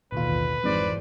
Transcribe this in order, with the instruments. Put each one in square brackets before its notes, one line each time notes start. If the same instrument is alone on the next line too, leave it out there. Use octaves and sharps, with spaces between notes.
[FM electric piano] A1 D#2 F4 [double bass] B2 D3 [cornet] B4
[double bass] G#1 E3 [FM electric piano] F2 G#2 [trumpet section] C5 D5